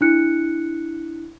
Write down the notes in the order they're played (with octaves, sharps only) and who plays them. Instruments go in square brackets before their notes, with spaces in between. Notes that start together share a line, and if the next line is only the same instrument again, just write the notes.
[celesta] D4 E4 F#6 C#7